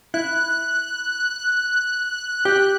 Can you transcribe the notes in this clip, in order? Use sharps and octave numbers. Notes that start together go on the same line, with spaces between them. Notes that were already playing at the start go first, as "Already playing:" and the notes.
E4 F#6
G4